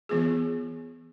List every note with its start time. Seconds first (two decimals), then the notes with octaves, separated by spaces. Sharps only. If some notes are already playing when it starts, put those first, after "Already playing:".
0.09 E3 B3 F4 G#4